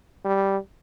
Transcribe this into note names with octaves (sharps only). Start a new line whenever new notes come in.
G3